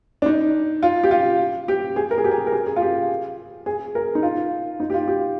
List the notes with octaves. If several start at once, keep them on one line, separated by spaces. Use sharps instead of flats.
D4
D#4
F4
G4
F4
G4
G#4
A#4
G#4
G4
G#4
A#4
G#4
G#4
F4
G4
G#4
A#4
D#4
F4
D#4
G4
F4
G4